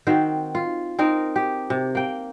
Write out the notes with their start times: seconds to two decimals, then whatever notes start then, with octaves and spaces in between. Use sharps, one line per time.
0.07 D#3 C4 F#4 C5
0.55 F4
0.99 C4 D#4 A#4
1.36 G4
1.70 C3
1.95 A#3 G5